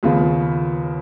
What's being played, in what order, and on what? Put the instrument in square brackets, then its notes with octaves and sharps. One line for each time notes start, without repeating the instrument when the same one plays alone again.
[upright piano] D#2 C#3 F3 B3 F4